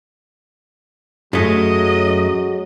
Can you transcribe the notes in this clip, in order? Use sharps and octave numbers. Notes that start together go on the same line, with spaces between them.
F#2 F#3 G#3 A3 D#5